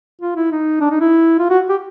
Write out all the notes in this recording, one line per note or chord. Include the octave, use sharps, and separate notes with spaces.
F4
E4
D#4
D4
D#4
E4
F4
F#4
G4